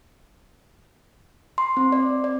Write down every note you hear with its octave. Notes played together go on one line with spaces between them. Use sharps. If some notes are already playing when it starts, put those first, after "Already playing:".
C6
C4
D5
D5